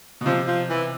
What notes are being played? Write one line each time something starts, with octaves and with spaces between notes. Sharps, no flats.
B2
C3 F3
F3
E3